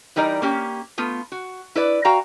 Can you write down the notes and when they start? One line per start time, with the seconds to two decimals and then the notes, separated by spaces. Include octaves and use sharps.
0.16 E3 G3 D#4 A#4 D5
0.42 A#3 C#4 G4
0.98 A3 B3 F4
1.32 F#4
1.75 E4 B4 D5
2.05 F#4 F5 G5 A#5